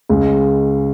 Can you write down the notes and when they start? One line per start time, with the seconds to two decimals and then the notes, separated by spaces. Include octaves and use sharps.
0.09 C#2 C#3 G#3